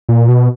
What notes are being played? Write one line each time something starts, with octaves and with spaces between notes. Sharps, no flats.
A#2
B2